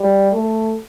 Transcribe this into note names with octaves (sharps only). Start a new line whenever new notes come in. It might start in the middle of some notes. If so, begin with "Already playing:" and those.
Already playing: G3
A3